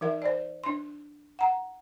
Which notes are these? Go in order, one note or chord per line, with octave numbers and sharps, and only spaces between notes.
E3 D#4 A#4 E5
C5 D5
D4 C6
F#5 A#5